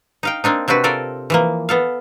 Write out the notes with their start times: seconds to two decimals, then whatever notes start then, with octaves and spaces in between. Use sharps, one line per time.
0.23 D#4 F5 G5
0.44 A#3 C4 D4 D#4
0.68 C3 C4 D4 F#4 B4
0.84 F4 A4 A#4 D5
1.30 E3 F3 A#3
1.69 B3 A4 F5